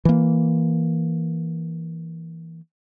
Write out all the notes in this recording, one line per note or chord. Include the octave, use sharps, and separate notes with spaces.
E3 A#3